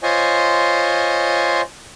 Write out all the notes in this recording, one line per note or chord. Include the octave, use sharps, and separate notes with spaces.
F4 C5 C#5 D#5 G#5